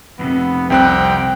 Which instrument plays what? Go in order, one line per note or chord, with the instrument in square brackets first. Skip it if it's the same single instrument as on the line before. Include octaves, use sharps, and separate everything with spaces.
[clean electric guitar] F2 A2 C3 [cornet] B3
[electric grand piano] C2 C4 F#6 [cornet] G5